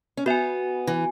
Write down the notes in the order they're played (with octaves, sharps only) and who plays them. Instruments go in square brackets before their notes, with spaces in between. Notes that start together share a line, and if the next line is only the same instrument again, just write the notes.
[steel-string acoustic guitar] C#4
[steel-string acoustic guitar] B3 [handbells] F#4 E5 G#5
[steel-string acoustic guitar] E3